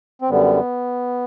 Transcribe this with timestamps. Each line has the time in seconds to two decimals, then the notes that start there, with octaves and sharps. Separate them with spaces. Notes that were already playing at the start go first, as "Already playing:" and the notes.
0.22 C4
0.30 F#2 D3 G3 B3